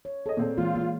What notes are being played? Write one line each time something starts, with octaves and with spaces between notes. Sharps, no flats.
C#5
G#4 A4 C#5 D#5
A#2 C4 A4
E3 G#3 A#3 F4
A#3